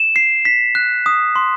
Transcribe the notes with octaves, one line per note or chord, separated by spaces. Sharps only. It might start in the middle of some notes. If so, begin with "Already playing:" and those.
Already playing: E7
C7
B6
F#6
D#6
C6